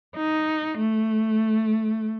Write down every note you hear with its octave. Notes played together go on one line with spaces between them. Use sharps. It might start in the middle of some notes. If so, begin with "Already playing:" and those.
D#4
A3